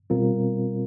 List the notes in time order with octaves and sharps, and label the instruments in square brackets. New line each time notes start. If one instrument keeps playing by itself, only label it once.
[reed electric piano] B2 G3 C4 F4 A#4